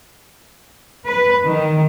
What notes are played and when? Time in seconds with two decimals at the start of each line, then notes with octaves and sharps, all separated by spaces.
1.07 B4
1.45 D#3